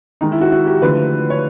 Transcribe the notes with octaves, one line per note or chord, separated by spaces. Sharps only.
D#3 G#3 D#4
E4
F#4
F#4
G4
D3 F3 A3 B4
C#5